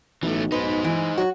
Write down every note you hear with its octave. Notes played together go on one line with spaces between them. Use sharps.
B1 E3 A3
D#4 B4 C5
E3
F#3 F#4